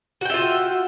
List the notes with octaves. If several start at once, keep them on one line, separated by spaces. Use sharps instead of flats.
F4 F#4 E5 G5